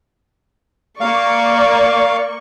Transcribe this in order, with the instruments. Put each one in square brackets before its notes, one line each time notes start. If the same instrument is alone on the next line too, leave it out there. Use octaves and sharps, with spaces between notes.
[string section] A#3 C#6 [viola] D5 [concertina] F5